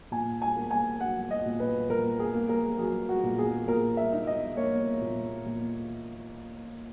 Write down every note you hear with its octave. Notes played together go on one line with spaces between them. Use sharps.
A#2 G#5
G#5
A#3
G#5
F#3 F#5
D#5
A#2
B4
A#2 A#4
G#4
A#3
A#4
F#3 G#4
F#4
A#2
G#4
A#2 A#4
E5
D#4
D#5
A#3 C#5
A#2
A#2